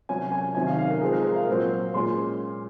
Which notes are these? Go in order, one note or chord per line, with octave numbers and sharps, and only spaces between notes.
C3 F#3 C#4 G#5
G#5
C3 D#3 F#3 C#4 G#5
F5
F5
A#4
F3 G#3 C4 G#4
A#4
A#4
F5
A#2 F#3 C4
A#2 G#3 C#4 C6